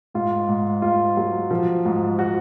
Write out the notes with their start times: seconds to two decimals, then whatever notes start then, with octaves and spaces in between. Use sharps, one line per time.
0.14 G#2 F4
0.48 G#2
0.82 G#2 F4
1.17 F#3
1.51 F3
1.85 G#2
2.19 F#4